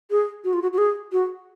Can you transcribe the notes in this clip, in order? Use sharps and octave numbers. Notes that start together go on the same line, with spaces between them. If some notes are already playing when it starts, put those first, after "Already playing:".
G#4
F#4
F4
F#4
F#4
G#4
F#4